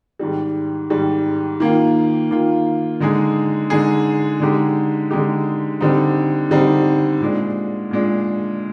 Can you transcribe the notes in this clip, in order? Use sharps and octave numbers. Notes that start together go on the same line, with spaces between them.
G#2 D#3 G3
G#2 D#3 G3
D#3 A#3 F4
D#3 A#3 F4
D3 G#3 D#4 G#4
D3 G#3 D#4 G#4
D3 G#3 D#4 G4
D3 G#3 D#4 G4
D3 G3 C4 D#4
D3 G3 C4 D#4
A#2 G#3 D4
A#2 G#3 D4